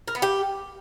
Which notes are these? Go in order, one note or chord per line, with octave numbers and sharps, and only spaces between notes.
A#4
B3
G4